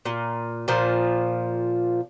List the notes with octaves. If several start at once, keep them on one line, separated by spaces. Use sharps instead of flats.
A#2
A#2 F3